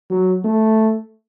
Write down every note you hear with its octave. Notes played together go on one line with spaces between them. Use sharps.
F#3
A3